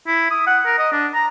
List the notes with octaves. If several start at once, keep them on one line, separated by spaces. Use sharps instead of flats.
E4
D#6
F#5
A#4
D#5
D4
A#5